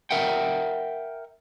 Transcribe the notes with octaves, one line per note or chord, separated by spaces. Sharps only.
A#4 E5 F#5 G5